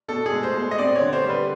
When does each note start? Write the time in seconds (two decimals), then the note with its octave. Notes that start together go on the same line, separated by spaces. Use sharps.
0.08 B2 A4
0.26 G#4
0.31 G#3
0.43 C5
0.55 B2
0.71 D#5
0.78 C4 D5
0.96 C#5
1.01 D3
1.13 C5
1.24 G3
1.30 B4